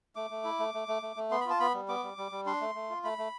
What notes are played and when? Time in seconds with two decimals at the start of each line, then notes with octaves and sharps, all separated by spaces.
0.16 A3 D6
0.30 A3
0.44 E4
0.59 A3
0.74 A3
0.88 A3
1.02 A3
1.16 A3
1.31 B3 C6
1.41 B5
1.46 F4 A5
1.60 B3 B5
1.74 G3
1.89 B3 D6
2.03 G3
2.18 G3
2.32 G3
2.46 D4 C6
2.61 A3
2.75 A3
2.90 F4
3.04 A3 B5
3.18 A3